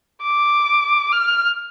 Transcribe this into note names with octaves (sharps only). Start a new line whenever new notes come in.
D6
F6